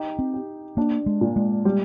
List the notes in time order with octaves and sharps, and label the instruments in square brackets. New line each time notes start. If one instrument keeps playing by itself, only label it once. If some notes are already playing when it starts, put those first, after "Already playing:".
Already playing: [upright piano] D#4 G4
[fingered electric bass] C4
[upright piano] G4
[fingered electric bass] A#3 [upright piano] D4
[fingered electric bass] G#3
[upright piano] A#2
[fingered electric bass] G#3
[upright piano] G3